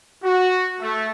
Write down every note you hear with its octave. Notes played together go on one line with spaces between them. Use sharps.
F#4
A3